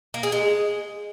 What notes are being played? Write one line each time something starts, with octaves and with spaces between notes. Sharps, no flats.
A#3
G#4
G#3